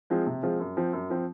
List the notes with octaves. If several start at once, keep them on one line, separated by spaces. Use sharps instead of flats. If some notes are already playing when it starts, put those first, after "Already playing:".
F3 G#3 C4 F4
C3
F3 G#3 C4 F4
F#2
F3 C4
F#2
F3 C4